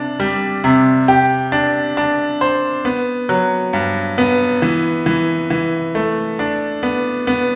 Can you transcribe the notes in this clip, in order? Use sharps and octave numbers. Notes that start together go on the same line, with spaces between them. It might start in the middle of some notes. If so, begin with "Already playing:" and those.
Already playing: C3 D4
G3
C3
G4
D4
D4
C5
B3
F#3
G2
B3
E3
E3
E3
A3
D4
B3
B3